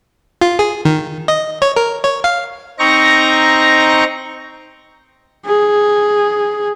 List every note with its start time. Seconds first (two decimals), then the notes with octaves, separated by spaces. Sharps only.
0.41 F4
0.59 G#4
0.85 D#3
1.28 D#5
1.62 C#5
1.76 A#4
2.04 C#5
2.24 F5
2.79 C4 D#4 A#5 C#6 A#6
5.46 G#4